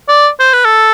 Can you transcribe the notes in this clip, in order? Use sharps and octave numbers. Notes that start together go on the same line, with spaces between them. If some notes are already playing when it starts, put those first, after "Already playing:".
D5
C5
B4
A4